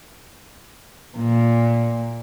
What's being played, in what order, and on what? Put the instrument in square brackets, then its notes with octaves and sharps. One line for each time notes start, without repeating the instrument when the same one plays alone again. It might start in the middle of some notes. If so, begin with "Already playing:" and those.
[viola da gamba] A#2